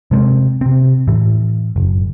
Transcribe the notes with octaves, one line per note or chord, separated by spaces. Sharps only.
C3 G#3 A#3 C4
C3 C4
A2 E3
F#1